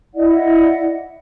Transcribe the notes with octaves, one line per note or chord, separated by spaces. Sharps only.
E4 D5 D#5 F#5